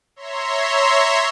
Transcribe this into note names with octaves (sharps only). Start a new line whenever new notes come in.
C#5 E5 A#5 C6